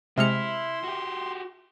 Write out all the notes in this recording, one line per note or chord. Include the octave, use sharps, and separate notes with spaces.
C3 G#3 E4 E5 C6 F6 C#7 F7
F#4 G4